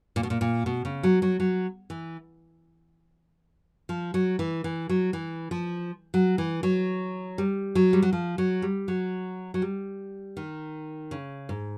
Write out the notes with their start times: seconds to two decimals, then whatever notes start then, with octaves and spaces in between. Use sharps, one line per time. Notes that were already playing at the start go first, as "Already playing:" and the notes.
0.16 A#2
0.23 B2
0.30 A#2
0.41 A#2
0.66 B2
0.85 C#3
1.03 F#3
1.22 F#3
1.40 F#3
1.90 E3
3.89 F3
4.14 F#3
4.39 E3
4.64 E3
4.89 F#3
5.13 E3
5.51 F3
6.14 F#3
6.38 E3
6.63 F#3
7.38 G3
7.75 F#3
7.93 G3
8.02 F#3
8.13 F3
8.38 F#3
8.62 G3
8.88 F#3
9.54 F#3
9.62 G3
10.37 D#3
11.11 C#3
11.49 G#2